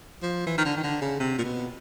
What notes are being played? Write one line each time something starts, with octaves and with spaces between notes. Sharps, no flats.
F3
E3
D#3
D3
D#3
D3
C#3
C3
A#2
B2